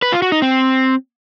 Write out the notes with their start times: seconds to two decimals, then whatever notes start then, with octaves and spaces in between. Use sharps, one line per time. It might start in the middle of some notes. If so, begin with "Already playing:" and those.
0.02 B4
0.12 F4
0.22 F#4
0.32 D#4
0.42 C4